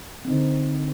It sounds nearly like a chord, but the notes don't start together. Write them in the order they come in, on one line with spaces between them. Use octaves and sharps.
C4 D#4 D3